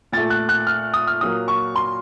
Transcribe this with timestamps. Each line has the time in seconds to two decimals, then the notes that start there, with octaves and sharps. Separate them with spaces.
0.12 A#2 A3 A6
0.30 F#6
0.49 F#6
0.67 F6
0.94 D#6
1.07 F6
1.21 A#2 F#3 A#3 D#6
1.48 C#6
1.76 C6